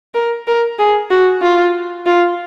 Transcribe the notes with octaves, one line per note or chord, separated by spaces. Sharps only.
A#4
A#4
G#4
F#4
F4
F4